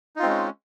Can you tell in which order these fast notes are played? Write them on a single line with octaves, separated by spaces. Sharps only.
D#4 F4 C4 G#3 C#4